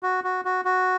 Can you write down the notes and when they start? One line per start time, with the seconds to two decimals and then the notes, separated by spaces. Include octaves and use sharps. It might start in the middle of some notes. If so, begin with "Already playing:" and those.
0.03 F#4
0.24 F#4
0.45 F#4
0.65 F#4